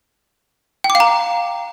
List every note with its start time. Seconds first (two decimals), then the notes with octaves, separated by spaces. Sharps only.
0.84 G5
0.90 D6
0.95 F5
1.00 A#5